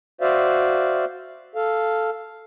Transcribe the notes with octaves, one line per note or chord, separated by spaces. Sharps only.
F#4 C5 D5 E5 F5
A4 F5